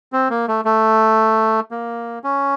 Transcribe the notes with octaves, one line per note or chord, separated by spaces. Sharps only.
C4
A#3
A3
A3
A#3
C#4